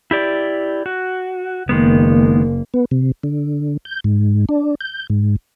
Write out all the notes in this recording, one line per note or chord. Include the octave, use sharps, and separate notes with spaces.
E4 G4 D5
F#4
F#1 D#3 G#3 A#3 B3
B3
C3
D3
G6
G#2
D4
G6
G#2